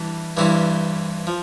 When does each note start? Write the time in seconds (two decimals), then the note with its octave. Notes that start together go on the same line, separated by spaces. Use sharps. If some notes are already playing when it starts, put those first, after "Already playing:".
Already playing: E3 G3 D4
0.37 G2 E3 G3 C4 E4
1.27 F3